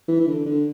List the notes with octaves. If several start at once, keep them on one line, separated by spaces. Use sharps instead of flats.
E3
E3
D3
D3